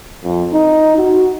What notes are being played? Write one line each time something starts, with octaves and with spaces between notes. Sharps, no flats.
F2
D#4
F#4